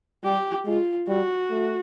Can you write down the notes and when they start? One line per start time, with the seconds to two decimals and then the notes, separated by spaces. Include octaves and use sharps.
0.24 G3 G4
0.66 G#3 F4
1.08 G3 F#4
1.50 A3